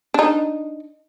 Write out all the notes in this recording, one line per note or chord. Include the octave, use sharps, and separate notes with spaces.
D4 D#4